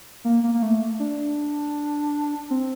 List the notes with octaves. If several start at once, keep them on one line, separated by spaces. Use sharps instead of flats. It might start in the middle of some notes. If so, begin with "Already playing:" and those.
A#3
A#3
A#3
A3
D4
C4